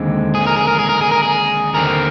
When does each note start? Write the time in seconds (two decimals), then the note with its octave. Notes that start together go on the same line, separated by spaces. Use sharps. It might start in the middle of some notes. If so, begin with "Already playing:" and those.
Already playing: D#2 D3 G#3 C4
0.35 G#4
0.47 A#4
0.56 G#4
0.67 A#4
0.79 G#4
0.89 A#4
1.01 G#4
1.12 A#4
1.23 G#4
1.74 D#2 D3 G3 C4 A#4